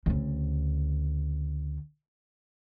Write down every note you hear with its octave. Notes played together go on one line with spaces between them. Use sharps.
D2 C#3